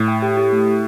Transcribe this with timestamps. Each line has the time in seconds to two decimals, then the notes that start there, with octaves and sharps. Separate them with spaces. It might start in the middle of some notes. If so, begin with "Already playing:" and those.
Already playing: A2
0.08 G5
0.22 G4
0.37 G4
0.52 A3
0.67 A3